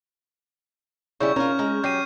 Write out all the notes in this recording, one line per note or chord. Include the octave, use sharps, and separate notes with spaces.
C#3 G3 C#4 E4 C#6 G6
C#4 F4 A#4 C#6 F6
G#3 A#5
F#3 G4 G6 C7 D#7